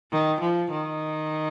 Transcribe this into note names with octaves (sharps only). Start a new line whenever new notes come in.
D#3
F3
D#3